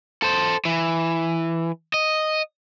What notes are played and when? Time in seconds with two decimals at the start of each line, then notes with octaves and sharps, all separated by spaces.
0.23 A4 C5
0.65 E3
1.94 D#5